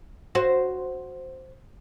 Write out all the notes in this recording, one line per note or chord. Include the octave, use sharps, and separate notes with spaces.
F#4 C5